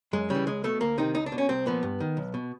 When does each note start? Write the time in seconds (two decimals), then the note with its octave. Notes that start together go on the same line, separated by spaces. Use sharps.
0.13 F#2 G#3
0.30 C#3 E3 G3
0.47 C#2 G#3
0.64 B2 A3
0.81 D2 A#3
0.98 C3 D#3 D#4
1.15 C#2 D#4
1.26 D4
1.32 B2
1.38 C#4
1.49 C2 C4
1.66 A#2 F3 B3
1.83 G2
2.00 D#3
2.17 B1
2.34 B2